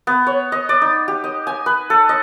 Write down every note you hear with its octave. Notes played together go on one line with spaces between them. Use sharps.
B3
C#5
D#5
D5
D#4
G4
D#5
G#5
B4
A4
D#5